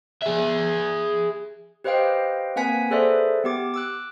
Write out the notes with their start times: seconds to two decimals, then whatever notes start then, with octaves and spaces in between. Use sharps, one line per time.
0.22 G#4 E5
1.84 G4 B4 C5 D#5 F5 G5
2.56 A#3 C4 B4 F#5 G#5 B6
2.91 G#4 A4 B4 C5 D5 E5
3.44 B3 G4 D6
3.74 D6 E6 F#6